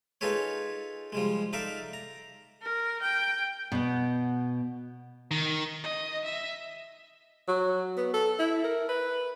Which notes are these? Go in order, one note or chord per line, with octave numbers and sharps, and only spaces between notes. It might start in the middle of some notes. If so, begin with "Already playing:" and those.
D#4 F4 G#4 A4 B4 C#5
F3 G3 G#3
D#4 A4 D5 E5 F5
A#5
A#4
G5
B2 B3
D#3
D#5
E5
F#3
B3
A4
E4
A#4
B4